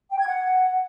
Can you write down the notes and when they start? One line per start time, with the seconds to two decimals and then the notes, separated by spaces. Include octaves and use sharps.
0.10 G5
0.19 G#6
0.27 F#5